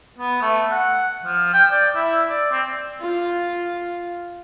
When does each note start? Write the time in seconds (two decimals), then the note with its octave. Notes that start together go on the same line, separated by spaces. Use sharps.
0.19 B3
0.42 A3
0.72 F#5
1.24 F3
1.53 G5
1.71 D5
1.95 E4
2.27 D5
2.52 C4
3.01 F4